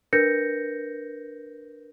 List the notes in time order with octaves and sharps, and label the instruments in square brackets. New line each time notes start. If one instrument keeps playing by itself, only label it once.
[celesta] D4 A#4 B4 G6 A#6 C#7